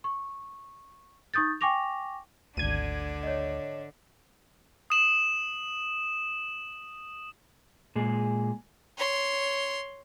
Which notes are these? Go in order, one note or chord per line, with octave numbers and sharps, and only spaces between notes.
C#6
D#4 C#6 D#6 G6 A6
G5 G#5 C#6 D6 A#6 F7
G#1 D2 D3 D4 G#6 D#7
C#5 D#5
D#6 E7 F#7
A#2 G#3 G#4
C#5 C6